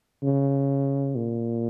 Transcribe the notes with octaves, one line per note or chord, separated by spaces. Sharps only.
C#3
A#2